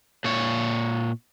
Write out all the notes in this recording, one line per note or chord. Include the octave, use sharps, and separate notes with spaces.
A#2 C#5